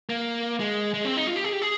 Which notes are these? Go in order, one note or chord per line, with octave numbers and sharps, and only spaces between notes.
A#3
G#3
G#3
C4
D#4
F4
G4
G#4
G4
G#4